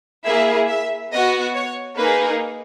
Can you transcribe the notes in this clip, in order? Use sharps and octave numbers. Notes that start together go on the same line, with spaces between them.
A#3 E4 G#4 E5
E5
B3 F#4 D#5
C#5
A#3 D#4 G#4 B4